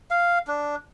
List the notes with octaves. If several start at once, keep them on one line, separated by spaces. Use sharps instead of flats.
F5
D4